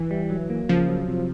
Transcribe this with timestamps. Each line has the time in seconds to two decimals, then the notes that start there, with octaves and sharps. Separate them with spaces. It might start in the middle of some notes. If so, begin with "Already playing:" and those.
Already playing: E3
0.11 G3
0.30 F#3
0.50 A#3
0.69 C#3 F3
0.89 F#3
1.08 C3